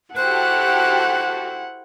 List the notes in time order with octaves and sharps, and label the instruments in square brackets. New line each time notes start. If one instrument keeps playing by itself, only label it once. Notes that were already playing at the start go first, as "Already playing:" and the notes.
[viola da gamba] E4 C5 [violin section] F#4 G4 A4 [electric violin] F#5 [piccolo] F#6